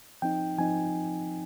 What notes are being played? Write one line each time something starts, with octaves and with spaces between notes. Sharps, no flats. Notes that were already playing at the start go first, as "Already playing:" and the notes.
F3 C4 D#4 G5
F3 C4 D#4 G#5